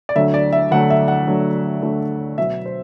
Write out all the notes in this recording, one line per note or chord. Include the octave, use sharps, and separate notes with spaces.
D5
D2 D3 F#3 A3 E5
D5
E5
D2 D3 F#3 A3 F#5
E5
F#5
D2 D3 F#3 A3
D2 D3 F#3 A3
B2 F#3 B3 E5
C5